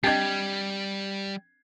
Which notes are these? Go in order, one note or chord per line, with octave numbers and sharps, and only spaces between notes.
G3 C4 D4 G4 D#5 G#6 C7